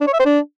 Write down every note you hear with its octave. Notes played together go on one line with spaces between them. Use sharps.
D4
C#5
E5
C5
D4